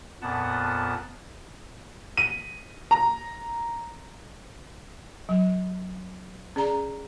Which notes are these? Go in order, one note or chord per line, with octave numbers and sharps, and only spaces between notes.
F2 A#2 B3 F#5 A5
D#7
A#5
F#3
C#4 G#4 D5 A#5